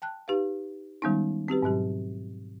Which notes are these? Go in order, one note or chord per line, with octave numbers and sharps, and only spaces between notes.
G5 A5 F#6
D#4 G4 B4 F5
D#3 G3 G#3 B3 C#4 D#4
C4 F#4 G4 B4
G#2 B2 F#3 G4